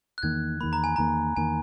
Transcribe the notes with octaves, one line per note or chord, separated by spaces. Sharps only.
F#6
E2 D#3 A#3 G#6
E2 D#3 A#3 B5
A#5
G#5
E2 D#3 A#3 A#5
E2 D#3 A#3 G#5